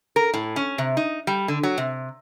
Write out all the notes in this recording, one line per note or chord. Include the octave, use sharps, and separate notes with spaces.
A#4
A2
C#4
C3
D#4
G3
D3
F#3
C3